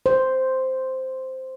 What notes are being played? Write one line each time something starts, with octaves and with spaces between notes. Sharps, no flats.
C5